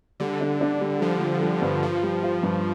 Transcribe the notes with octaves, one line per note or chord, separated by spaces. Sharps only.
D3 G3
D4
D4
G3
F3 G3
G3
G3
G2
F3 F4
G3
F4
G2